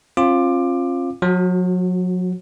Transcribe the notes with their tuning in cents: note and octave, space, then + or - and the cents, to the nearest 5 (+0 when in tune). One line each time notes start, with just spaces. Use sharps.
C4 +45 F4 +0 D6 +20
F#3 -35 F#4 +0